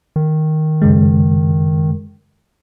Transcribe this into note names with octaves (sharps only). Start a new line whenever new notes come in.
D#3
F#2 C#3 G#3